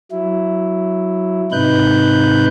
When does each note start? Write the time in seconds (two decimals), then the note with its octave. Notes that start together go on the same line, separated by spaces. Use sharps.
0.11 F#3 E4
1.52 G#2 C3 D#4 B4 F#6 G6